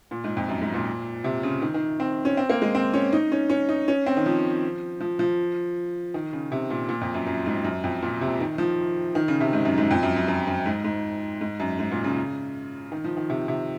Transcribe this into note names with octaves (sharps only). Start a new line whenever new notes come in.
A#2
G#2
F2
F#2
G#2
A#2
C3
C#3
D#3
D#3
C4
C#4
C4
A#3
G#3
C4
C#4
D#4
C#4
C#4
D#4
C#4
C4
D#3
F3
F3
F3
D#3
C#3
C3
A#2
A#2
F2
F#2
F#2
G#2
F#2
F2
A#2
C3
D#3
F3
D#3
C#3
C3
G#2
F#2
G#2
F2
F#2
F#2
F#2
F#2
G#2
G#2
G#2
F#2
G#2
A#2
C#3
D#3
F3
D#3
C3
C3